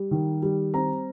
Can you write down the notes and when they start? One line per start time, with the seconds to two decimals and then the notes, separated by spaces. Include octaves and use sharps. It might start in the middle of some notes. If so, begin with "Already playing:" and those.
Already playing: G3
0.11 D#3
0.42 G3
0.74 C4 A#5